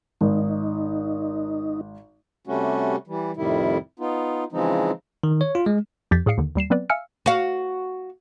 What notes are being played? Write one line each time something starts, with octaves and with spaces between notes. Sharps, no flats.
G#1 D#4
C3 G3 A3 C#4 F#4
E3 G3
F2 A2 C3 D#3 G3 E4
B3 D#4 F4
C#3 E3 F3 G#3 C4 D#4
D#3
C#5
F4
G#3
F2 F3 G4 G6 A6 B6
A2 G#4 D5 F5 C7 C#7
D#2 D3 D#3
D#2 G3 C7 E7
F#3 B3 C4 B4 D5
E5 F5 G#5 E6 F6 C#7
F#4 F5